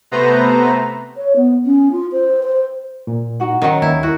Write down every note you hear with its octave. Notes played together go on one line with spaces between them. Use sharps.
C3 A3 B3 B4 C5 A#5
C#5
B3
C#4
F4
C5
C5
A#2
D#4 F#4 F#5
D#3 F#3 C#4 C5 F#5
D#2 E4
E4 F#4 A#4